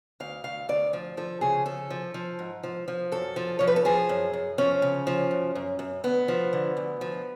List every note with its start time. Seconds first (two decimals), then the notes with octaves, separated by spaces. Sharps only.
0.20 D2 F5
0.44 D2 F5
0.69 D2 D5
0.93 F3
1.17 F3 A4
1.41 C#3 G#4
1.66 F3 A4
1.90 F3
2.14 F3
2.39 G#2
2.63 F3
2.88 F3
3.12 F#2 A4
3.36 F3
3.59 F3 C#5
3.67 B4
3.76 A4
3.85 F3 G#4
4.09 F#2
4.33 F#2
4.58 F3 C#4
4.82 C#3
5.07 F3
5.31 F#2
5.55 F#2
5.79 F#2
6.04 D2 B3
6.28 F3
6.53 D3
6.77 D2
7.01 F3